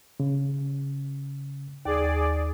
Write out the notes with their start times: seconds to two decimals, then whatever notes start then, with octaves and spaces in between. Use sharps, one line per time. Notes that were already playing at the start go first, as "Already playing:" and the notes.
0.20 C#3
1.85 D#2 G#4 D5